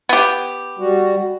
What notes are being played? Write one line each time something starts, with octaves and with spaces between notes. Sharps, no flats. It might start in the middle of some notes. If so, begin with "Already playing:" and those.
B3 G4
G3 F#4